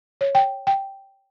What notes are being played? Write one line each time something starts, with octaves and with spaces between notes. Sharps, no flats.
C#5
G5
G5